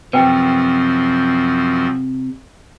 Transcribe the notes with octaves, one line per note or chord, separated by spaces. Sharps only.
F#2 C3 F3 C4 B4 F#5 G5